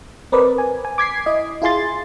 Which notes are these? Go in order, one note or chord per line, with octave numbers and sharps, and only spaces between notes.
C4 A#4 B4 D5 D#5
G#5
G#5
D6 G#6 B6 C7
E4 D#5
E4 F4 G#4 G#5 C6 A6